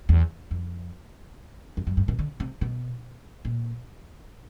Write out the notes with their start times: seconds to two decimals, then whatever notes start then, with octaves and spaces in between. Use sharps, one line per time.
0.09 E2
0.51 F2
1.77 F2
1.87 F#2
1.97 G2
2.08 B2
2.19 D3
2.40 C3
2.61 B2
3.45 A#2